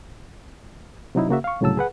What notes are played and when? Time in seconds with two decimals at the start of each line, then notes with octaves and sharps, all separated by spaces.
1.15 C3 F#3 D#4 E4
1.29 C#3 A#3 F#4 E5
1.44 F5 C#6
1.61 C2 A2 C#3 F#3 A5 E6
1.77 G#4 B4 F#5